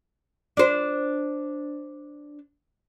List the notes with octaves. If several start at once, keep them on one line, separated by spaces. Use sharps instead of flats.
D4 C5